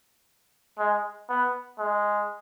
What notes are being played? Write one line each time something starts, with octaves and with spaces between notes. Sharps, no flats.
G#3
B3
G#3